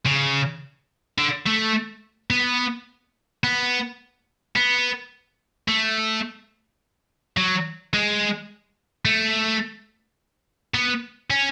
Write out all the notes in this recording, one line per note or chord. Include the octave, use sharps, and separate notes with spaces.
C#3
D3
A3
B3
B3
B3
A3
F#3
G#3
A3
B3
C#4